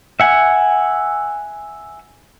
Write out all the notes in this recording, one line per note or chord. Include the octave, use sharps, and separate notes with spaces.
E5 F#5 G#5